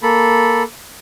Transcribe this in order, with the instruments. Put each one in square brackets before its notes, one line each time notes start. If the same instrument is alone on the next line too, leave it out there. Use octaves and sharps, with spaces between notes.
[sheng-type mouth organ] A#3 A4 B5